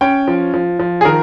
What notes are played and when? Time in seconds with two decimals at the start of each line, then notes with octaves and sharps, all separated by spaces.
0.01 C#4 G5
0.28 F3
0.54 F3
0.80 F3
1.01 G#4
1.05 D#3 A#4